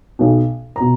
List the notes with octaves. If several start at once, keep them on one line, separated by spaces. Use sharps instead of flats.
B1 B2
B2 A#5